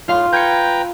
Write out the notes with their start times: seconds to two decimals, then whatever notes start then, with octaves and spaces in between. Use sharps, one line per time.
0.08 A2 F4 F5 C6
0.33 B4 G5 A#5 G6 G#6 C#7